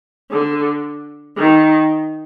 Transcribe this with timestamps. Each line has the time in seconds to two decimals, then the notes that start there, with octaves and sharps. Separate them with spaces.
0.31 D3
1.38 D#3